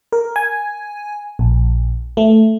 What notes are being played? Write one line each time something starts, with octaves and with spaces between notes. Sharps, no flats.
A#4
G#5
A#1
A3